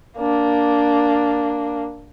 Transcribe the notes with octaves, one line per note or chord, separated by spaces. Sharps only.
A#3 D4